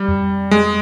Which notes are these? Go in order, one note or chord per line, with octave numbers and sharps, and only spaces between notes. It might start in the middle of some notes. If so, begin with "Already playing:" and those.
Already playing: G3
F2
G#3